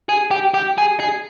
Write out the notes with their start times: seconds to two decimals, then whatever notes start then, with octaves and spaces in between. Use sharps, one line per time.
0.09 G#4
0.31 G4
0.54 G4
0.78 G#4
1.00 G#4